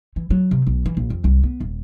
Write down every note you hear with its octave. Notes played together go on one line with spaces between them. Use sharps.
E3
F#3
C3
B1
E3
A#1
F2
C2
B3
D#1